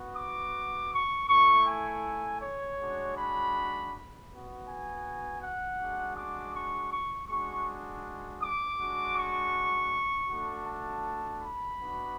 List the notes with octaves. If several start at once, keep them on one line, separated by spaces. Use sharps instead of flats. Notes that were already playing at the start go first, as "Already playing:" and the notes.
Already playing: B3 F#4
D6
C#6
A3 E4 C#6
G#5
C#5
G#3 D4 F#4
B5
B3 F#4
G#5
F#5
G#3 D4 F#4
D6
C#6
C#6
G#3 D4 F#4 C#6
D6
G#3 D4 F#4
C#6
A3 D4 F#4
A5
B5
B3 D4 F#4